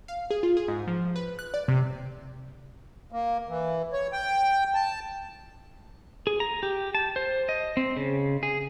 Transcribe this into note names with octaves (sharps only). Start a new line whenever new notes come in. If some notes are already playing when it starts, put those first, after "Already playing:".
F5
G#4
F4
G#4
G#2
F3
B4
F#6
D5
C3
A#3
E3
C#5
G5
A5
G#4
A#5
G4
A5
C5
D#5
C4
C#3
G#4